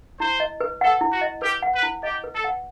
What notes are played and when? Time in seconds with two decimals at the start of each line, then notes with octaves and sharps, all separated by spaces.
0.19 E4 C5
0.40 D#5
0.61 B4
0.81 A4 F#5
1.01 E4
1.12 F#4
1.21 D#5
1.42 G4 B4
1.63 F#5
1.73 B4
1.83 E4
2.03 G4 D#5
2.24 B4
2.33 A4
2.44 F#5